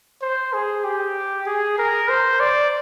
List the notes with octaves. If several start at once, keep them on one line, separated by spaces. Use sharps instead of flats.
C5
G#4
G4
G#4
A#4
C5
D5